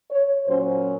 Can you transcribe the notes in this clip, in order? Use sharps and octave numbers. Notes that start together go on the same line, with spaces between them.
C#5
A#2 F#3 C#4 C5